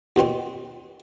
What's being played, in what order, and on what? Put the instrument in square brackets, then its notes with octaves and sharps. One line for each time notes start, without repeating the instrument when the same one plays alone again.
[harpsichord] D#2 B2 C4 C#4